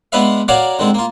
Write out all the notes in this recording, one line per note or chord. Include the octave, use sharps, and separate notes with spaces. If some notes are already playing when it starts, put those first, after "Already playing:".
G#3 B3 D4 B4 E5 F5
F#4 A#4 C#5 D5 F5 F#5
D3 D#3 G#3 C4
A#3 F4